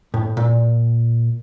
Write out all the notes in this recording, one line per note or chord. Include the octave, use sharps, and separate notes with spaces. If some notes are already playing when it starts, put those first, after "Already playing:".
A2
A#2